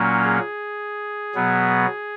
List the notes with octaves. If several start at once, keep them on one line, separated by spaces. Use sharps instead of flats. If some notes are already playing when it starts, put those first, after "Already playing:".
Already playing: A#2 F#3 A#3 C#4
G#4
B2 F#3 B3